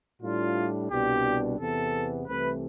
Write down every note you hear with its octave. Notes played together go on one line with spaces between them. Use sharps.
A2 G3 D4 F4
C2 B2 G3 D4 G4
E2 C3 E3 B3 A4
C2 C3 E3 A3 B4